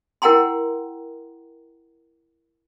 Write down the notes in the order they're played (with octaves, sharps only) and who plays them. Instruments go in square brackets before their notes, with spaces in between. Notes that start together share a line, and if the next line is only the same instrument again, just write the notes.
[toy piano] E4 A#4 F#5 G5 A#5 C6